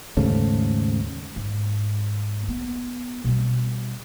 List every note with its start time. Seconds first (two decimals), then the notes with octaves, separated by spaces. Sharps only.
0.17 D#2 G#2 C#3 A3
1.36 G#2
2.48 B3
3.24 B2 G3